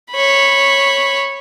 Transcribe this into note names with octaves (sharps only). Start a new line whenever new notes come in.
C#5 B5